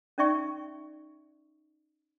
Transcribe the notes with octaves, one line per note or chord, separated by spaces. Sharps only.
C#4 D#4 D5 E5 G5 C#6